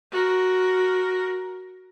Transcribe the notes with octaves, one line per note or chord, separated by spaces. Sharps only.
F#4 A#4